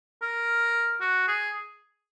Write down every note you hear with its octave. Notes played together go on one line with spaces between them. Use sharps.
A#4
F#4
G#4